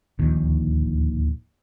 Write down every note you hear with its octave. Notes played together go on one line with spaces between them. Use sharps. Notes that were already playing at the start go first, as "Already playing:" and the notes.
D1 A#1 D#2 D#3